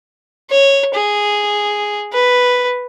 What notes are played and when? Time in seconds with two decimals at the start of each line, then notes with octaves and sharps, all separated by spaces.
0.50 C#5
0.94 G#4
2.12 B4